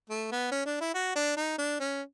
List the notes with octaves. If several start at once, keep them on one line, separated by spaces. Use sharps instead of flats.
A3
B3
C#4
D4
E4
F#4
D4
D#4
D4
C#4